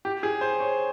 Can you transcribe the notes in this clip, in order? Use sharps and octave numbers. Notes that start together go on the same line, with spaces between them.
G4
G#4
C5
C#5